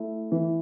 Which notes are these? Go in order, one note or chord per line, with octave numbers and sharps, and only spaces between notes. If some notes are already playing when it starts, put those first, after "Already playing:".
Already playing: A3 E4
E3